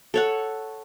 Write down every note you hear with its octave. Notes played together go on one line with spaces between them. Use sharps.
A4 C#5 F#5